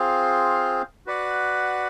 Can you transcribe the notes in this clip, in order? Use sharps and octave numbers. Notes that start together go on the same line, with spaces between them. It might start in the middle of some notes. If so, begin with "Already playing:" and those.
Already playing: C4 F4 G#4 C5 F5
F#4 B4 D5 F#5